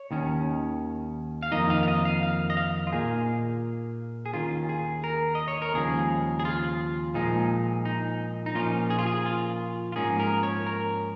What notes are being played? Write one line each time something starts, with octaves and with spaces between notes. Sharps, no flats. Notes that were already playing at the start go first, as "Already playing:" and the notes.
Already playing: C#5
D#2 D#3 C#4
F5
F2 D#3 A#3 D#4 D#5
F5
F5
D#5
F5
F5
D#5
F5
F4
A#2 A#3 D#4 G#4
G#4
D#2 D#3 C#4 F4
G#4
A#4
D#5
C#5
A#4
D#2 C#3 F3 G#3 G#4
G#4
F4
A#2 F3 G#3 D#4
D#4
D#4
A#2 F3 C#4 F4
G#4
F4
G#4
F4
F4
G#2 F3 A#3 C#4 G#4
A#4
C#5
A#4